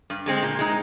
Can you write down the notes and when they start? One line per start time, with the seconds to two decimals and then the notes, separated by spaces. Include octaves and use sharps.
0.10 G2
0.26 D3 G#3 C4
0.43 A#2
0.59 G#3 D#4